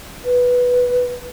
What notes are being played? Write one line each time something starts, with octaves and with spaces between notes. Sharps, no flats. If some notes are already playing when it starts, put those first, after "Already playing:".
B4